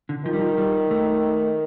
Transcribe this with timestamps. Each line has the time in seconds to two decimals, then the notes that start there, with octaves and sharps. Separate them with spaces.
0.09 D3
0.25 D#3 F3
0.33 G3
0.41 F3
0.58 G3
0.91 A3